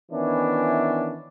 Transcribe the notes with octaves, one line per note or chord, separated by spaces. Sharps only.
D#3 E3 B3 C#4 D4 E4